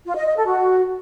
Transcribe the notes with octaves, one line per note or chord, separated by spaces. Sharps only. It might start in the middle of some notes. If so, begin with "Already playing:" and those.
F4
D#5
D#5
A4
F#4